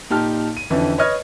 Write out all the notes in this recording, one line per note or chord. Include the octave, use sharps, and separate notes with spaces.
A#2 D#4 G4 A5 F6
D#7
F2 D3 E3 C#4
B4 C#5 D#5 F6 G#6